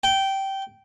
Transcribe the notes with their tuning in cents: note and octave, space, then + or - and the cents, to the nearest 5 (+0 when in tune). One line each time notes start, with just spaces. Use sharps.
G5 -15